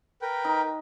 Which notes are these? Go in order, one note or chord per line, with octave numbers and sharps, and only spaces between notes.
A#4 B4 G5
D#4